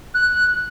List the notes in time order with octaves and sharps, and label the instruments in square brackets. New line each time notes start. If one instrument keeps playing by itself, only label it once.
[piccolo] F#6